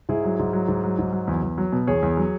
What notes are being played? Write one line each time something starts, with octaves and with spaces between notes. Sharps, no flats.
G#2 E4 G#4
F#3
G#2
F#3
G#2
F#3
G#2
F#3
E2
E2
F#3
B2
E2 G#4 C#5
E2
F#3